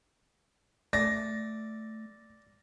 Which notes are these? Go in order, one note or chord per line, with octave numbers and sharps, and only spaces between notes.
A3 D5 A#6